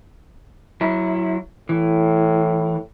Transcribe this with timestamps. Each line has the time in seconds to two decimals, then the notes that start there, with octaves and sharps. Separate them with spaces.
0.81 F#3 E4
1.69 A2 E3